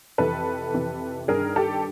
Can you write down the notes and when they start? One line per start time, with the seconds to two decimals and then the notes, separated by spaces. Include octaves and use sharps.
0.18 F2 C3 E3 A4 B4
0.74 F2 C3 E3
1.28 G2 D#3 G#4 A#4
1.56 G4 A4